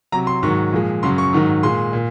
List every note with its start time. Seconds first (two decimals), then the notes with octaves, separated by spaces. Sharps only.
0.12 C3 F#3 A#5
0.27 C6
0.43 G#2 D#3 F#3 C#6
0.73 A#2 F3 G#3
1.03 F#2 C#3 F#3 C6
1.18 C#6
1.33 G#2 D#3 F#3
1.63 A#2 G#3 C6
1.93 A#2